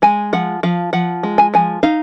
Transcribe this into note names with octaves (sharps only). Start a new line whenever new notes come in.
G#3 G#5
F3 F#5
F3 F5
F3 F#5
G#3
G#5
F3 G#5
D#4 F5